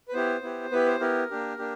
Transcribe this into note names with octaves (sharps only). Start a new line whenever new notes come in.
B4
B3 E4 G4 C5
B3 E4 G4
B3 E4 G4 B4
C5
B3 E4 G4 A#4
A#3 D4 G4
A#3 D4 G4